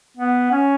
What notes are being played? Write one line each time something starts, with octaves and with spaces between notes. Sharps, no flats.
B3
C#4